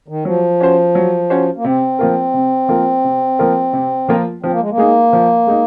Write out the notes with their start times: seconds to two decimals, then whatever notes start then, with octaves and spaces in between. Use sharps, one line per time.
0.08 D#3
0.25 F3 F#3
0.60 C#4 F#4 C5
0.95 F#3
1.30 C#4 F#4 C5
1.57 A#3
1.64 C3 C4
1.99 F3 A#3 F4 A#4
2.34 C3
2.69 F3 A#3 F4 A#4
3.04 C3
3.39 F3 A#3 F4 A#4
3.73 C3
4.08 F3 A#3 F4 A#4
4.43 F3 C4
4.52 A#3
4.61 G#3
4.70 A#3
4.78 G#3 D#4 G#4
5.13 F3
5.47 G#3 D#4